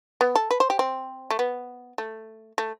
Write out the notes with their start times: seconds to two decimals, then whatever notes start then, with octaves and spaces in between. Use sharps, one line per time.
0.21 B3
0.35 A4
0.51 B4
0.60 C5
0.70 G4
0.79 C4
1.31 A3
1.39 B3
1.98 A3
2.58 A3